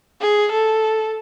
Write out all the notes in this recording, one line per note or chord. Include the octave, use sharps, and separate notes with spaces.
G#4
A4